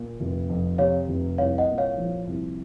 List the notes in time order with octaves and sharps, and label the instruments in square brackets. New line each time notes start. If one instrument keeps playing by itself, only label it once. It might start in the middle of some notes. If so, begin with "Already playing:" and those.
Already playing: [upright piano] A#2
F1
F2
[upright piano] C3 [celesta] C#5 F5
[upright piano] F1
[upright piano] C2 [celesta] C#5 F5
[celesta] D#5 F#5
[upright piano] A#2
[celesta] C#5 F5
[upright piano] F3
C2